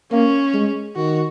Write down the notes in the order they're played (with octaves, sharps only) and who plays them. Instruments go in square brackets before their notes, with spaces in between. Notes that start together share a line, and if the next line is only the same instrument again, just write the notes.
[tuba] A#3 [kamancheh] C#4
[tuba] G#3
[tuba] D#3 [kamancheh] F#4